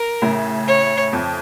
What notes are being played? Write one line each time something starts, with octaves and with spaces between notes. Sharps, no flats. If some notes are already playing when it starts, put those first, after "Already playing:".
Already playing: A#4
A2 C#3
C#5
F2